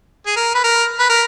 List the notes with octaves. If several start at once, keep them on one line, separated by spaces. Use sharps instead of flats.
G#4
A#4
B4
A#4
B4
A#4